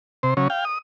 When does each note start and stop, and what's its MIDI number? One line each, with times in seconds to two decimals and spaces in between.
0.23 0.34 48
0.23 0.34 72
0.37 0.48 49
0.37 0.48 54
0.37 0.48 61
0.50 0.65 77
0.50 0.65 79
0.65 0.78 87